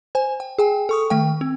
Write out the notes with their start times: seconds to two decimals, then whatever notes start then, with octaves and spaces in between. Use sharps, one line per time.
0.15 C5 G#5
0.40 G5
0.58 G#4 G5 G#5
0.89 A4 C#6 D#6
1.10 D#3 A3 G5
1.41 C4